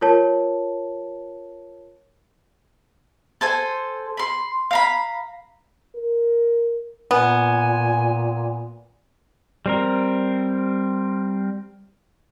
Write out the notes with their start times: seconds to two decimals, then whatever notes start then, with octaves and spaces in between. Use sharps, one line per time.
0.01 F4 A#4 C#5 A5
3.41 A4 C5 G#5
4.17 B5 C6
4.71 F5 A#5 B5
5.96 A#4
7.11 A#2 B3 G#5
9.66 G3 C4 A#4